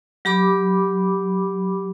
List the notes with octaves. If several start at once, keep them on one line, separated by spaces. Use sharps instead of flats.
F#3 G4 B5 D6